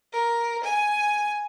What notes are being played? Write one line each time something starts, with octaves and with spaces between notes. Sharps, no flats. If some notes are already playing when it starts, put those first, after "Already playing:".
A#4
G#5